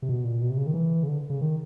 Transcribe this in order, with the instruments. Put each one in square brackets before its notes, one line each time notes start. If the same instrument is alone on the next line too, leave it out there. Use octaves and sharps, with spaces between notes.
[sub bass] C3
B2
A#2
B2
C3
C#3
D#3
E3
C#3
D3
C#3
D#3